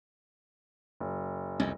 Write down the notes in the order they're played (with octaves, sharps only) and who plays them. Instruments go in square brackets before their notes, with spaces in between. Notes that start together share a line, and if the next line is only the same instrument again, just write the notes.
[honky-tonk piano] F#1
[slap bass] C2 F2 [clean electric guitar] C#4 D#5